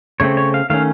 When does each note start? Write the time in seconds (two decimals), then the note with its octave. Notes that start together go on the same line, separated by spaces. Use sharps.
0.20 C#3 A3 C4 C#5
0.37 C#5
0.54 F5
0.70 D#3 A3 C#4 F5